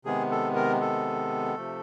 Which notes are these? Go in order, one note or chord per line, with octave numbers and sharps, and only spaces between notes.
C3 D#3 G#3 B3 G#4
A4
A#4
A4
C3 F3 A3